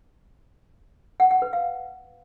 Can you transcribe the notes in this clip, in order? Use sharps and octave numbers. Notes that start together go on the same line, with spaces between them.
F#5
F#5
B4
F5